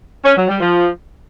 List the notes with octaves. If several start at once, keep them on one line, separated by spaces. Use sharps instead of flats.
C#4
F#3
G3
F3